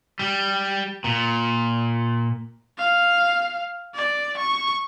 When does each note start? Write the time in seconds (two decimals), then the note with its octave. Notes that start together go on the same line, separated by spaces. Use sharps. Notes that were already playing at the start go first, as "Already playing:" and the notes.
0.19 G3
1.04 A#2
2.78 F5
3.95 D5
4.38 C#6